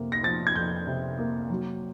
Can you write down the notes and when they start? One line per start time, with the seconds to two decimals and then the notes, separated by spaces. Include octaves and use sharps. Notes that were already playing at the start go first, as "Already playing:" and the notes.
Already playing: F2 C3 A#3
0.12 A#6
0.23 F3 A6
0.47 G#6
0.56 F2 G6
0.87 C3
1.18 A#3
1.50 F#3